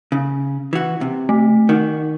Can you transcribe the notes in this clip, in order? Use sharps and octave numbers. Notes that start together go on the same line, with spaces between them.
C#3
E3 F#4
C3
A3
D#3 F#4